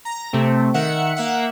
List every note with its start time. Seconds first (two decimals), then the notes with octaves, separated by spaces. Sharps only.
0.05 A#5 A#6
0.33 C3 A3 C4
0.74 D#3 E5 F#5 C#7
1.16 A#3 E5 F#5